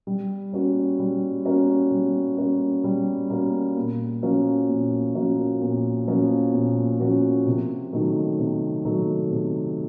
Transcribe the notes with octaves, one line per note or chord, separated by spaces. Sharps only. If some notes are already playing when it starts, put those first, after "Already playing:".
G3
A#3 C#4 F#4
G3
A#3 C#4 F#4
G3
A#3 C#4 F#4
G3
A#3 C#4 F#4
A#2
F3 A#3 C#4 F#4
A#2
F3 A#3 C#4 F#4
A#2
F3 A#3 C#4 F#4
A#2
F3 A#3 C#4 F#4
C3
D#3 F#3 A3
C3
D#3 F#3 A3
C3